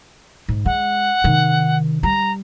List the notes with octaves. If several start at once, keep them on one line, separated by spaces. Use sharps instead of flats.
G#2
G#3 F#5
C3 D#3
G3 A#5